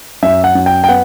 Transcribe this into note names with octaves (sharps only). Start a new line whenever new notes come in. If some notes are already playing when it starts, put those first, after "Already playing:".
F#2 E5
F#5
F#2
G5
G5
B3 F#5